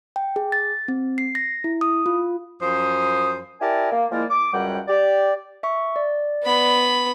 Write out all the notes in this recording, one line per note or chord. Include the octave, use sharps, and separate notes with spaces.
G5
G#4
A6
C4
C7
A#6
E4
D#6
F4
F#2 F3 C5 D#6
E4 G4 A#4 D5 G#5 A5
A#3
F3 G#3 A#3 E4 A#4 D5
D6
C#2 F#2 G3 F#5 G5
G4 D5
E5 C#6
D5
B3 B5